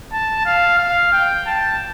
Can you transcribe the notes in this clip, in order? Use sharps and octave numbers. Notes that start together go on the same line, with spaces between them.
A5
F5
F5
G5
A5